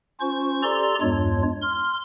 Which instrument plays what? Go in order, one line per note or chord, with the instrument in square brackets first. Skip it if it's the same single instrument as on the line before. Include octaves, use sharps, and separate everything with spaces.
[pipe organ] C#4 F4 C5 C#6
G4 A4 D5 A#5 C6
E2 G2 G#3 D4 F4 C#5
C6 F6